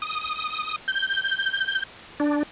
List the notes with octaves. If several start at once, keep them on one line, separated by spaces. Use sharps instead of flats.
D#6
G6
D4